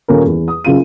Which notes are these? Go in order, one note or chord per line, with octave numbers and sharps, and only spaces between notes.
D#1 C#4 F4 A4 A#4
E2
D#6
F#1 F#2 C#3 F4 D#7